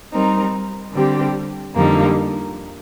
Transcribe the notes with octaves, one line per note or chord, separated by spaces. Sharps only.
G3 C4 D#4 A#4
D3 G3 C4 G4
F2 D3 G3 A#3 D#4